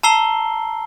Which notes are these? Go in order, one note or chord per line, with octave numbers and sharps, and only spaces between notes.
A5 A#5 E6 C7 G7